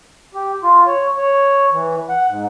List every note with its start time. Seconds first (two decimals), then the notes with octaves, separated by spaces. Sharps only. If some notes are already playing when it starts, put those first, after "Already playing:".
0.34 G4
0.63 F4
0.87 C#5
1.18 C#5
1.72 E3
2.09 F#5
2.29 G#2